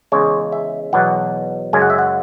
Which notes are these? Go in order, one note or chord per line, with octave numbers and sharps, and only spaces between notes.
E2 C#3 G#3 C#5
E5
E2 B2 F#3 F#5
F#2 C#3 G#3 G#5
F#5
E5
F#5